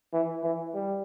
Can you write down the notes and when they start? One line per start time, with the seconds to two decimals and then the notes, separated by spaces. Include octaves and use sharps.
0.13 E3
0.43 E3
0.74 G3